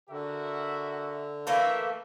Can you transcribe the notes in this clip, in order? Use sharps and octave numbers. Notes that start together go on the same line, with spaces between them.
D3 F#4 A#4 E5
E3 A3 A#3 E5 F5